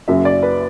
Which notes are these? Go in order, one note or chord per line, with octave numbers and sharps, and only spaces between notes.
F#1 F#2 C#3 F#3 E5
D5
B4